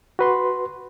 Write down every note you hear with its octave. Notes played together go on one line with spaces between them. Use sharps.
F#4 B4 C6